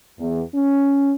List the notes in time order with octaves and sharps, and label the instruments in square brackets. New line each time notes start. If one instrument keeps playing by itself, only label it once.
[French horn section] E2
C#4